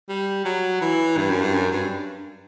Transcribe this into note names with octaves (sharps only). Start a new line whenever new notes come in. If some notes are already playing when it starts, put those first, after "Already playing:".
G3
F#3
E3
G2
F#2
G2
F#2
G2